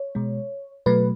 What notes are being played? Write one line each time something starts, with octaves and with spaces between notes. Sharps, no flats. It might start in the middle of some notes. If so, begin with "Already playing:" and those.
Already playing: C#5
B2 G#3
B2 F#3 A3 B4